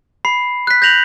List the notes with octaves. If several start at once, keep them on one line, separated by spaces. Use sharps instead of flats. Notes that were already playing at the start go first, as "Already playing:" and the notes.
B5 C7
F#6 B6
G6 A#6 F7 F#7